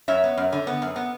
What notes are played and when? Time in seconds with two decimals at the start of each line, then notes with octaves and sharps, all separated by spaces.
0.08 F#2 C#5 E5
0.24 B3
0.37 F#2
0.52 D3
0.67 B3
0.82 F#2
0.96 B3